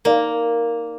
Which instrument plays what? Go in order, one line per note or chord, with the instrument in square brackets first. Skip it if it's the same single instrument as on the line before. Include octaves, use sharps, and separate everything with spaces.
[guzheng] A#3 [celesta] D#4 A#4 D5 F5